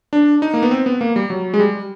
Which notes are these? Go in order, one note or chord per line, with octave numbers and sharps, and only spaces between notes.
D4
D#4
A#3
B3
C4
B3
A#3
G3
F#3
G#3
G3